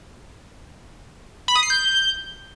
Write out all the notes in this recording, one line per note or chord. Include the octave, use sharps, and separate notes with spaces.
B5
D#6
C7
G6